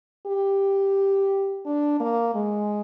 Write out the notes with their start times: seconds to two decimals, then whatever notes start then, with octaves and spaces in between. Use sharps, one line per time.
0.26 G4
1.66 D4
2.00 A#3
2.35 G#3